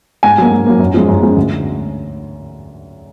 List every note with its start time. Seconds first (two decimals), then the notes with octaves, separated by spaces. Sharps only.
0.23 G#2 G#5
0.38 F#3 A#3
0.51 G#2
0.66 F#3 A#3
0.80 F#2
0.94 F3 G#3
1.08 F#2
1.22 F3 G#3
1.36 D2